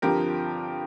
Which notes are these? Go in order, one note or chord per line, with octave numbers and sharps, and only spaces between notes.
G2 D3 F3 C4 G4 A#4